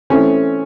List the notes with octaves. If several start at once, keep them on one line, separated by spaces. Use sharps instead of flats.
E3 A3 C4 C#4